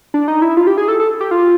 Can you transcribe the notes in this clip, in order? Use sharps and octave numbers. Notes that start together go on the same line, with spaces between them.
D4
D#4
E4
F4
G4
G#4
A4
A4
G4
F4